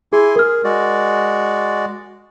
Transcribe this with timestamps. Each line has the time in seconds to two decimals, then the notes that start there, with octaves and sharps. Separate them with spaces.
0.13 E4 G#4 G#5 C6
0.36 G#4 A#4 F6
0.64 G#3 F#4 D5